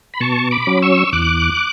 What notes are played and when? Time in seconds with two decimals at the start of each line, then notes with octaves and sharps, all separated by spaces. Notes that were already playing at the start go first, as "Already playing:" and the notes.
0.14 B5
0.20 B2 A5 C#6
0.51 B5 D6
0.67 F#3 C#4
0.82 C#6 E6
1.12 E2 D6 F#6